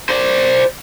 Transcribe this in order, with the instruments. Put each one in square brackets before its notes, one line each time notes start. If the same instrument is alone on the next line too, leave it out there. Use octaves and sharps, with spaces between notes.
[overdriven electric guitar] C5 D5